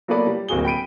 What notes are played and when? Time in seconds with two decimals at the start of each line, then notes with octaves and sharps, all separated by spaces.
0.08 F#3 A#3 B3 A4 B4 D5
0.27 G3
0.49 D1 A#3 C4 F#4 G#4 G7
0.65 G5 B5 D7 D#7